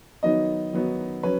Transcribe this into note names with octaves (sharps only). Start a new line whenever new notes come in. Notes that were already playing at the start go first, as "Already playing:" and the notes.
D#3 F#3 B3 D#4 D#5
D#3 F#3 B3 D#4
F#3 C#4 B4